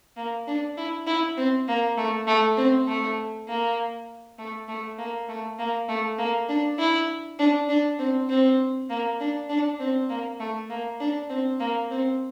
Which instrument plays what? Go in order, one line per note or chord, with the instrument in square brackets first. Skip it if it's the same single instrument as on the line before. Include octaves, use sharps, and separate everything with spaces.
[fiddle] A#3
D4
E4
E4
C4
A#3
A3
A3
C4
A3
A#3
A3
A3
A#3
A3
A#3
A3
A#3
D4
E4
D4
D4
C4
C4
A#3
D4
D4
C4
A#3
A3
A#3
D4
C4
A#3
C4